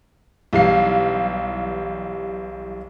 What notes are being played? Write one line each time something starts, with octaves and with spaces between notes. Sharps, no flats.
B1 E3 G3 F5 C7